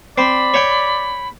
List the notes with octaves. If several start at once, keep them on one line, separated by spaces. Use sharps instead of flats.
C4 D5 B5
C#5 G5